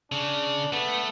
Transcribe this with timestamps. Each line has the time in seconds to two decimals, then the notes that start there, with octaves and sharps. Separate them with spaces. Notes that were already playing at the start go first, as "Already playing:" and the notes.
0.12 C#3 D4
0.73 A3 B3